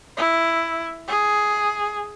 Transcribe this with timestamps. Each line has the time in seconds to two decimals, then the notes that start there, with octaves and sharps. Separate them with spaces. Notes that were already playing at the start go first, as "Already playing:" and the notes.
0.17 E4
1.08 G#4